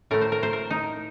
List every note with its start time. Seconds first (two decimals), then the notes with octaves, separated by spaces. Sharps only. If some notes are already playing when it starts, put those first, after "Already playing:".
0.11 A2 A3 A#4
0.21 C5
0.32 A#4
0.43 C5
0.53 A#4
0.71 D#4